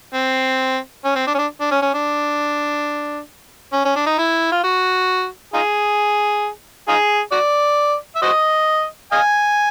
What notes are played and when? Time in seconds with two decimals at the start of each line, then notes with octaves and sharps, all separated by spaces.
0.14 C4
1.05 C#4
1.16 C4
1.27 D4
1.34 C#4
1.38 D4
1.61 D4
1.71 C#4
1.82 C#4
1.94 D4
3.73 C#4
3.85 C#4
3.96 D4
4.07 D#4
4.18 E4
4.52 F4
4.64 F#4
5.54 D#4 F4 G#4
6.88 D#4 F4 G#4
7.32 F#4 D5
8.15 E5
8.22 F#4 C5 D#5
9.12 D#5 F5 G#5